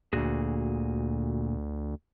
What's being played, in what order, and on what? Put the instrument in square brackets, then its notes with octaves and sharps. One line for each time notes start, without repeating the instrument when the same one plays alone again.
[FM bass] D2 [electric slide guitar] A#2 F#4 G#4